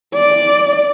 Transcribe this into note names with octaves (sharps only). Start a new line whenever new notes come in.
D5